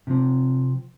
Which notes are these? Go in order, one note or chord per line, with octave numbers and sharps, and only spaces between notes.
C3 F3 C4